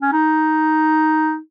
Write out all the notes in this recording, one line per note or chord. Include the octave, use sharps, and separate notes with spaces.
C#4
D#4